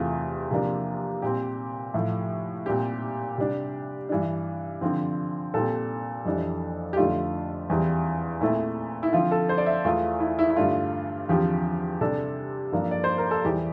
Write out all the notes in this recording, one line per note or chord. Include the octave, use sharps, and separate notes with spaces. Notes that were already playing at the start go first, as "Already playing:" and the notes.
Already playing: E2 C3 E3 A3 C4 F4
C3 F3 A#3 D4
A#2 G3 C4 G4
A2 F3 A3
A#2 G3 C4 G4
C3 G3 D4
G2 E3 G3 D4
D3 F3 C4
A#2 G3 C4 A4
F2 E3 G3 D4
G4
F2 D3 A3 D4 F4
E2 E3 G3 C4
A#2 A3 C4 E4
E4
D3 F3 C4 F4
A4
C5
D5
E5
E2 E3 A3 F4
E4
E4
E4
G2 D3 A3 D4 F4
E2 D3 F3 C4 G4
C3 G3 D4 A4
G2 F3 A#3 D4
D5
C5
A#4
A4
E2 E3 G3 G4